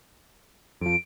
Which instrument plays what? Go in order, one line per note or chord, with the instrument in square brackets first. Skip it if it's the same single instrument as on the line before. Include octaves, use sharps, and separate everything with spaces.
[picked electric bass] F2 F3 [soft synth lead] D7